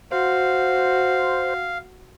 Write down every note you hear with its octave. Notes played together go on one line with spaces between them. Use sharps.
F#4 C5 F5